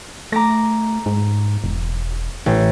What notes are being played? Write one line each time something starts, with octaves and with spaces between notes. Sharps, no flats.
A3 A#5 D6 A#6
G#2
E1
A1